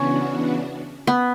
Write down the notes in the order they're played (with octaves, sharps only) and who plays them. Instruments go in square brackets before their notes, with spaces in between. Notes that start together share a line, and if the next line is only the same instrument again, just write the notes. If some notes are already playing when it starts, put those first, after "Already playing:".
Already playing: [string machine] C#3 E3 B3 D4 F#4 [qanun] C#4
[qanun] B3